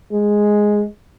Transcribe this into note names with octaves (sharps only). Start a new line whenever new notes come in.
G#3